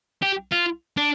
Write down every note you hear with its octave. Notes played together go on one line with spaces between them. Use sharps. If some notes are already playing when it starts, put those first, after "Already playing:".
G4
F4
D4